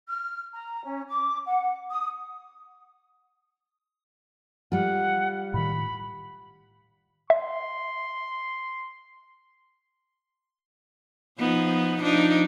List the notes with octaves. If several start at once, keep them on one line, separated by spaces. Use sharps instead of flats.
F6
A#5
C#4
D6
F#5
D#6
G3 F4 F#5
A2 D#3 B5
E5 C6
F3 B3 D#4
F3 D4 D#4